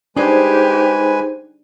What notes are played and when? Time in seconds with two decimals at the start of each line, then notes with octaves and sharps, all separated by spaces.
0.17 G#3 D4 D#4 G4 G#4 B4 C5 G#5